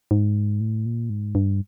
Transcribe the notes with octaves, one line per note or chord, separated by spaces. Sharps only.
G#2
A2
A#2
G#2
G2